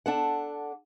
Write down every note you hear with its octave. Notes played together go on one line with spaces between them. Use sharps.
D4 A4 F#5